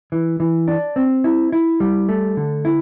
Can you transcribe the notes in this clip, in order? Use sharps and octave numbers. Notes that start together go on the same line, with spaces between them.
E3
E3
D4
C4
E4
E4
G3
A3
D3
E4